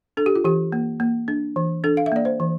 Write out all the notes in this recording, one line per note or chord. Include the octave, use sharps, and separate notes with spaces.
D4 A4
G4
F4
E3 G4
A#3
A#3
D4
E3
D4 A4
F5
E5
A#3 D5
C5
E3